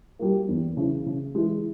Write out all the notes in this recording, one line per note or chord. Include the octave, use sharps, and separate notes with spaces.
G3 A#3
E2
C#3 E3
C#3
E3 G#3